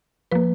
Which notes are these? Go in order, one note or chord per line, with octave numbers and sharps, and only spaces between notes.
F3 A#3 B4